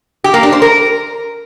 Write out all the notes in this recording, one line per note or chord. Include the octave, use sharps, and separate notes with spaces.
G4
A#3
D4
C5
A#4